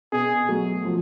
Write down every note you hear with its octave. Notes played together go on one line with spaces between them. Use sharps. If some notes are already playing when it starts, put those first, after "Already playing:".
B2 G#4
F#3 A3
F3